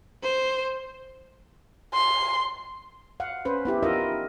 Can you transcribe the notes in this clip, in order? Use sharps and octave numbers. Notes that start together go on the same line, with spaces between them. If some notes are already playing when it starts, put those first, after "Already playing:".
C5
C6
F5 F#5
C#4 B4 C5
B3 E4 G4
D#4 F4 A#4 D#5 E5